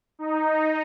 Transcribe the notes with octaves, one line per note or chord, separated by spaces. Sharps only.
D#4